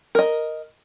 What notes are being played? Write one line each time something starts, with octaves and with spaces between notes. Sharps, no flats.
A#4 D#5